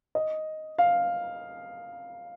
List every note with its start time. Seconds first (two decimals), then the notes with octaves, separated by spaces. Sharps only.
0.15 D#5
0.78 F5